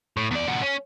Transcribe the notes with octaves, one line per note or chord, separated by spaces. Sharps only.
A2
E2 D5
A#2 F#4
C#4